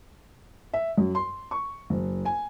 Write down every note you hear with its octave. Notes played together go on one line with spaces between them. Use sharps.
E5
F#2
C6
C#6
F#1
G#5